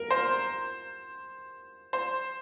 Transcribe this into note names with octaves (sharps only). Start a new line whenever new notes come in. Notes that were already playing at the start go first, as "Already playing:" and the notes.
Already playing: A#4
C5
C5